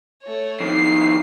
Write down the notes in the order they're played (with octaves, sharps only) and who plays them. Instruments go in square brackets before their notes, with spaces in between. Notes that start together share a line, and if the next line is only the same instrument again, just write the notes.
[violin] A3 C#5
[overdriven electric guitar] F2 D#3 [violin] C7